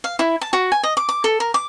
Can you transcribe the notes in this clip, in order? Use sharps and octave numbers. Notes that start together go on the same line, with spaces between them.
F5
E4
A5
F#4
G#5
D#5
D6
D6
A4
A#4
D6